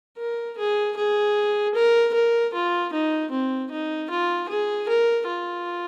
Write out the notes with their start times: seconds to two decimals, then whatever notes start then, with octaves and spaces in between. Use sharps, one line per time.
0.18 A#4
0.58 G#4
0.97 G#4
1.75 A#4
2.14 A#4
2.54 F4
2.93 D#4
3.31 C4
3.71 D#4
4.10 F4
4.49 G#4
4.89 A#4
5.28 F4